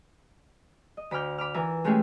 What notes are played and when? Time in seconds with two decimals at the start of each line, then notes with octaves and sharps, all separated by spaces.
0.97 D#5
1.11 D2 B5 D6 F6 G6
1.38 B5 D6 F6
1.54 E3 F4 A#4 B4 E5
1.84 G#3 A3 C#4 G4 G#4 E5